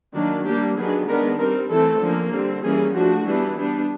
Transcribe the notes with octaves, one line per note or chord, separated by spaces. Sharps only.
D#3 F#3 A#3 D4
G3 A#3 D4 G4
D#3 F#3 B3 D4 G#4
D#3 G#3 B3 D4 A#4
G3 C4 A#4
E3 A3 C4 A4
D3 F3 A#3 C#4
D3 G3 C4
E3 G3 A#3 C#4 G#4
F3 A3 D4 F#4
E3 G3 B3 D4
G3 B3 D4